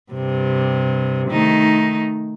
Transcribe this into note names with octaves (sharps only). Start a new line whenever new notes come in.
G2 C3
D#3 A3 D#4